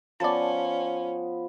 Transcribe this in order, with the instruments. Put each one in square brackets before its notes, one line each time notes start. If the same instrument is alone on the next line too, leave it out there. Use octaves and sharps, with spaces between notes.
[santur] F3 B3 [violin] C#4 [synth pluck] D5 A5